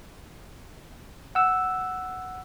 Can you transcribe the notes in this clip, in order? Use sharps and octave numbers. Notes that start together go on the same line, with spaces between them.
F#5 E6